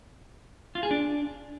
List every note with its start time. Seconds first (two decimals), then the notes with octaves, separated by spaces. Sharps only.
0.75 F4
0.83 G#4
0.91 D4